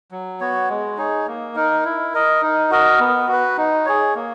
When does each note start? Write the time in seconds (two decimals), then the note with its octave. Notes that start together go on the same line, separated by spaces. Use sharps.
0.11 F#3
0.40 B3 F#4 C#5
0.69 G#3
0.97 D#4 G#4 C#5
1.27 A#3
1.55 D#4 A#4
1.85 E4
2.14 A#4 D#5
2.42 D#4
2.71 F#4 A#4 D#5
2.99 B3
3.28 F#4 B4
3.57 D#4
3.85 G#4 C#5
4.15 A#3